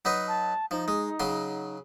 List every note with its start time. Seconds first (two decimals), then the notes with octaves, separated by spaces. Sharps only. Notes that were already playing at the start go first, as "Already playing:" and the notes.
0.05 F#3 D#4 B4
0.28 A5
0.71 F3 D#4
0.88 G#3
1.20 C#3 F#3 C6